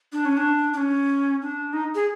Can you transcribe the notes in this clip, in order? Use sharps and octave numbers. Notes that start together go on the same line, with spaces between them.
D4
C#4
D4
D4
C#4
D4
D#4
G#4